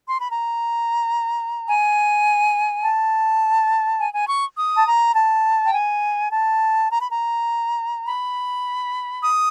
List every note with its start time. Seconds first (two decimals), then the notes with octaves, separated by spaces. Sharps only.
0.09 C6
0.19 B5
0.31 A#5
1.68 G#5
2.83 A5
4.00 G#5
4.14 G#5
4.28 C#6
4.57 D#6
4.76 A5
4.86 A#5
5.15 A5
5.64 G5
5.74 G#5
6.31 A5
6.90 A#5
7.00 B5
7.10 A#5
8.06 B5
9.22 D#6